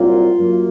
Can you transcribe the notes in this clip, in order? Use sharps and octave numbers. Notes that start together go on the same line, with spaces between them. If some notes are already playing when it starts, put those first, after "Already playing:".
Already playing: C2 A#2 F#3 A#3 F4
F#2 F#3 A#3